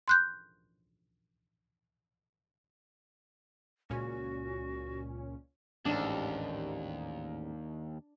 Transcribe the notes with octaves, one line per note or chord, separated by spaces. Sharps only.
C6 F#6 G6
C#2 A#2 C#4 F#4
A1 D#2 G#2 D4